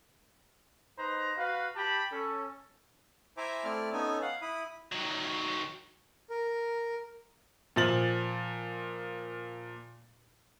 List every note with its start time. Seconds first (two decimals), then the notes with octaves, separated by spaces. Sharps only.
0.99 D#4 B4 C5 A#5
1.38 F#4 B4 F5
1.76 G4 G5 A5 B5
2.12 C#4 A4
3.37 E4 C5 E5 G#5 A#5 D6
3.64 A3 C4 E4 D5 A5 F6
3.93 B3 C#4 D#4 A4 G#5
4.22 F5 F#5
4.42 E4 B5 D#6
4.92 D#3 F#3
6.30 A#4
7.76 A#2 F3 A6 F#7